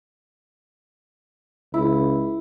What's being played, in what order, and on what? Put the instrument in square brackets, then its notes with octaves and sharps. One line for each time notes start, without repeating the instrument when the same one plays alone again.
[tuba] C#2 [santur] E4